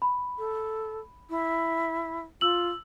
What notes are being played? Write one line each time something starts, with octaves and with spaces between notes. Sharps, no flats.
B5
A4
E4
F4 E6 F#7